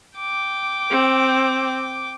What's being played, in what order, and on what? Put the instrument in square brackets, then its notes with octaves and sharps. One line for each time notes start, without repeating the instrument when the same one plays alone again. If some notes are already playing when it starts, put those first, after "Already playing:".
[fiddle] G5 D6
[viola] C4